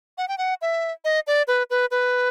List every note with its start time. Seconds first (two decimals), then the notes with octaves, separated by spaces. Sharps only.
0.18 F#5
0.28 G5
0.38 F#5
0.62 E5
1.05 D#5
1.27 D5
1.48 B4
1.70 B4
1.91 B4